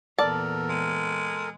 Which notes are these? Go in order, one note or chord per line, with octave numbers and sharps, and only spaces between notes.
E2 A#2 A4 A#4 D5 A5
G#3